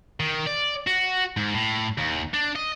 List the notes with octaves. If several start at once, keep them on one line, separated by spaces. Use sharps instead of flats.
D#3
D5
F#4
G#2
A2
D#2
D4
D#5